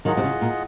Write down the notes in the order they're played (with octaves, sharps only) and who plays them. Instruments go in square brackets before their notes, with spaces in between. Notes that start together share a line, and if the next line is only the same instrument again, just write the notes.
[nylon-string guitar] D#3 F#3 [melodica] F4 G#4 D#5 F#5
[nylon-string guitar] C3
C#3
A#2